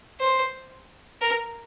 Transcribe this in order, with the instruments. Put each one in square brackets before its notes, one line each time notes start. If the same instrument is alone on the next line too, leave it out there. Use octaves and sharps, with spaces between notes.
[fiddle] C5
A#4